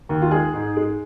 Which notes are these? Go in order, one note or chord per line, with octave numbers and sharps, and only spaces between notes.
D#2
F4
G#3 G#4
G#2
G#3